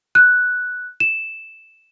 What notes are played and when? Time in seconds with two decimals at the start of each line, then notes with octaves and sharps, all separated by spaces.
0.15 F#6
1.00 E7